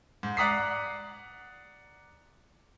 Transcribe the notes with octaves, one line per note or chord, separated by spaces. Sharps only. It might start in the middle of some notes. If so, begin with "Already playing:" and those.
G#2
D5 F#5 A#5 D#6 B6 C7